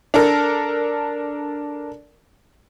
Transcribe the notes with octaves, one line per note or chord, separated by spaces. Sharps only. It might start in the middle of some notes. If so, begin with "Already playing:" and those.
D4 A4 A#4